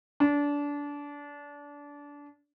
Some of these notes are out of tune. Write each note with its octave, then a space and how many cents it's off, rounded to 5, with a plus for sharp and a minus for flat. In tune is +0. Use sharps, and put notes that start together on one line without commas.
D4 -25